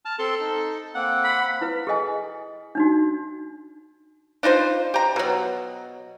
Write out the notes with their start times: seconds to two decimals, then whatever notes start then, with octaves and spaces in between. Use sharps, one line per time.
0.05 A5 F6
0.19 C4 A4 C6
0.40 D#4
0.95 A#3 C4 F#5
1.24 B5
1.61 E4 B4
1.87 G#4 A4 D#5 G#5
2.75 D4 D#4 F#4
4.43 D4 D#4 F4 C5
4.94 G4 A#5
5.16 B2 F#3